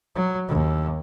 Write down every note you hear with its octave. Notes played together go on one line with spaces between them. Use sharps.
F#3
D#2